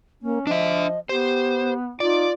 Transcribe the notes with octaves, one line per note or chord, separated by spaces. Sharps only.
A#3 C#4
F3 D4 D#5 E5
B3 G4 C5
D#4 F4 D5